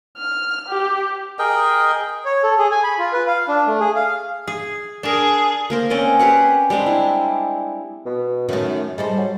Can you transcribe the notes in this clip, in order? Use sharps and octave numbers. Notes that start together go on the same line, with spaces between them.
F6
G4
G#4 A#4 D#5 G5
C#5
A4
G#4
G#5
B5
F4
B4
F5
D4
A3
G#4
F5
G#4
D4 G#4 A#4
A#3 A#4 C5
C4 C#4 D5 D#5
G4 G#4 B4 F#5
G3 G#3 C4 D4
E4
B2
F#2 D#3 A3
G3 G#3 A4 C5
F#3